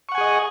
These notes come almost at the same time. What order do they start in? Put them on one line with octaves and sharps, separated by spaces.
C#6 F#5 G#5 G#4 D#5